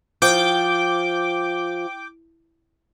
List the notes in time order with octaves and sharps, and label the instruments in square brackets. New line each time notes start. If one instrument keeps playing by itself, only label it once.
[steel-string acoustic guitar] F3 [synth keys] G5 D6 G6